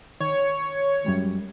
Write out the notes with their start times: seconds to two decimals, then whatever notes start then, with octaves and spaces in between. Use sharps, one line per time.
0.20 D#3 C#5
1.05 F#2 G3 G#3